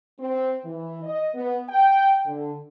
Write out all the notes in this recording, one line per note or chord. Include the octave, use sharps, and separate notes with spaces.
C4
E3
D#5
B3
G5
D3